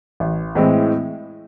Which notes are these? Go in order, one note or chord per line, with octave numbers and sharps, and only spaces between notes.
A1
A2 E3 G#3 C4